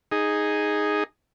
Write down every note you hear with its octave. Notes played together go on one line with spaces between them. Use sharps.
D#4 G#4